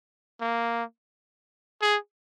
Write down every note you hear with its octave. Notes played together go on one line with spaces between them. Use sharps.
A#3
G#4